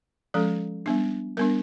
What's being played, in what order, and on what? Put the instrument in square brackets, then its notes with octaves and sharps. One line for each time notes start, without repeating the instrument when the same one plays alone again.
[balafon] F3 G#3 C#4 A4
G3 B3 D4
G3 B3 D4 A#4